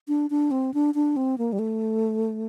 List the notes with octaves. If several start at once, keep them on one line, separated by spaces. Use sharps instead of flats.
D4
D4
C4
D4
D4
C4
A#3
G3
A3